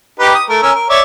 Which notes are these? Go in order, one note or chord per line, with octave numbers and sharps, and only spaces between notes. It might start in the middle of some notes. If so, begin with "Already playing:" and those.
D#4 G4 B4
D#6
A3 A#4
C#4 A#4 E6
A#4
C#5 D5 E5